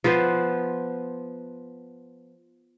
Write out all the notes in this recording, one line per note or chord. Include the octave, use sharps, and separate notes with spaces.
F3 B3 B4 C5